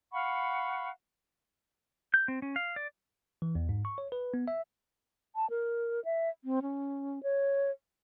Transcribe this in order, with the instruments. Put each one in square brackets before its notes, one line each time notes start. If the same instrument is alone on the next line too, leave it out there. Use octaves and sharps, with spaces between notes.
[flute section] F5 F#5 B5 C#6
[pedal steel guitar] G6
C4
C#4
F5
D5
[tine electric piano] E3
E2
G#2
C#6
C#5
B4
B3
E5
[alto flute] A5
A#4
E5
C4
C#4
C#5